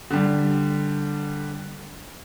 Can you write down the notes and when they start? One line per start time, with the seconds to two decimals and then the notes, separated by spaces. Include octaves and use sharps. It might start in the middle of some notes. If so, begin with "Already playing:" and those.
0.10 D3 G3